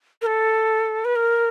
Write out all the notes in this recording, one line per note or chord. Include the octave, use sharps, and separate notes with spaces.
A#4
A4
B4
A#4